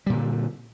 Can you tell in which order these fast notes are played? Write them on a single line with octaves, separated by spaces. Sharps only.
G3 A#2 D3